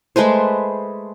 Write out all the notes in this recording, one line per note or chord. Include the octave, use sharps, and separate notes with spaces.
G#3 A3 B4 C5